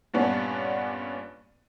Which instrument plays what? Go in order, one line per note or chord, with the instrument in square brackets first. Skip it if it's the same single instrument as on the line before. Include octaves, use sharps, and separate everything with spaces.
[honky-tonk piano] G2 A#2 B3 C#4 D4